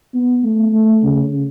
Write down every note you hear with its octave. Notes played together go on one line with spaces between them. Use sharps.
B3
A3
A3
C#3